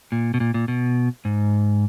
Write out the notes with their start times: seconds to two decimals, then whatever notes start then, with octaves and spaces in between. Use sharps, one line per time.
0.12 A#2
0.34 B2
0.40 A#2
0.54 A#2
0.68 B2
1.25 G#2